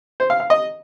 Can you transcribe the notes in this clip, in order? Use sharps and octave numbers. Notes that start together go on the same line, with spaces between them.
C5
F5
F5
D#5